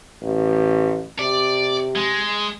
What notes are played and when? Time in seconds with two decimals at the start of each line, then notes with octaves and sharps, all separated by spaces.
0.22 A1
1.19 C3 D5
1.95 G#3